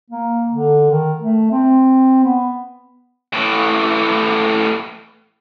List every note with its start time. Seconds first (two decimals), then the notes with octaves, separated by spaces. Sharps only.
0.10 A#3
0.49 D3
0.91 D#3
1.19 A3
1.51 C4
2.24 B3
3.33 A2 E3